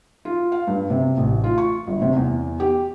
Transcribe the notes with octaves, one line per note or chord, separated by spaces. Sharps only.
F4
F5
G2
C3
A1
F4
C#6
G1
C3
E2
G4